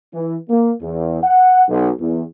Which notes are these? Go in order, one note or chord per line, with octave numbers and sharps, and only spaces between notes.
E3
A#3
E2
F#5
B1
E2